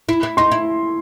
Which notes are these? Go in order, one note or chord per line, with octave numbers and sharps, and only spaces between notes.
E4
E4
D#4 C6
E4